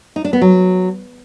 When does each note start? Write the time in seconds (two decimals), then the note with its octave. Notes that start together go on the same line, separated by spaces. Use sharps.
0.16 D#4
0.24 D4
0.33 B3
0.41 F#3